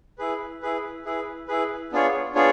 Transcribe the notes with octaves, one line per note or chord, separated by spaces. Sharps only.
E4 G#4 B4
E4 G#4 B4
E4 G#4 B4
E4 G#4 B4
B3 D4 F4 G#4 C#5
B3 D4 F4 G#4 C#5